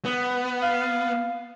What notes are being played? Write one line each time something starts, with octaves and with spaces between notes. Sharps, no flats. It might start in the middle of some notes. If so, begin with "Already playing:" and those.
B3
F5